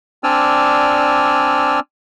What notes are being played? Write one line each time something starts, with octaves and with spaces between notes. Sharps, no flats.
C4 D4 D5 G#5 E6 F6